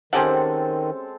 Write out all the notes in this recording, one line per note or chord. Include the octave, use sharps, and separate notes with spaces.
D#3 G#3 C4 C#4 G4 A4 F#5